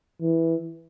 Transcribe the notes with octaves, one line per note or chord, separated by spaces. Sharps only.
E3